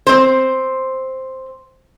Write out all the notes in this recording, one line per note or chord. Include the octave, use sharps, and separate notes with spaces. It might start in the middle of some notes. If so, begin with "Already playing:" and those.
C4 C5